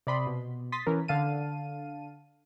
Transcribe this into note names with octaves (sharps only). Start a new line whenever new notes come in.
C3 D5 B5 C6 D#6
B2
C6 D#6 A6 B6
E3 C#4 A#4
D3 F5 A5 D#7